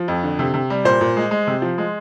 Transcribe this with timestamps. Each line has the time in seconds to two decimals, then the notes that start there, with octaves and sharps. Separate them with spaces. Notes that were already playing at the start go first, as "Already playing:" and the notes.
Already playing: F3
0.08 F2
0.23 D3
0.39 C3
0.54 C3
0.70 G3
0.85 A#2 C5
1.01 A#2
1.17 G#3
1.31 G#3
1.47 C3
1.62 F3
1.78 G#3